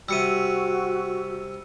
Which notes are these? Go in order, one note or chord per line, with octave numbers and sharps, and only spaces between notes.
C3 G3 F#4 E6 C#7 D#7